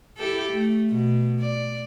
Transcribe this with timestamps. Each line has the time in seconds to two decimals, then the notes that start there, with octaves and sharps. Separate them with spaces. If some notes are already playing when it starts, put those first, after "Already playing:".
0.17 E4 G4 A4
0.52 A3
0.90 B2
1.40 D5